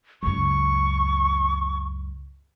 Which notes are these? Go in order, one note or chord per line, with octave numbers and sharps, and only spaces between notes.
C#2 F#2 C#6